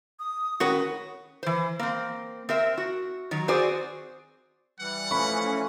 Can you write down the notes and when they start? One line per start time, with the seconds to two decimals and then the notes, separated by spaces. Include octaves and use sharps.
0.19 D#6
0.60 D#3 C#4 F#4 A#4 B4
1.43 E3 C5
1.79 A#3 C4
2.49 C4 A#4 E5
2.78 F#4
3.31 D#3 F#3
3.48 C4 F#4 G#4 C5 D5
4.80 E3 G3 F#5
5.11 E3 F3 A3 C#4 B5 C#6